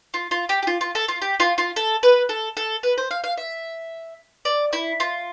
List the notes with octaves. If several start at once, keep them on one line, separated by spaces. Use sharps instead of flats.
F4
F4
G4
G4
F4
F4
A4
F4
G4
F4
F4
A4
B4
A4
A4
B4
C5
F5
F5
E5
D5
E4
F4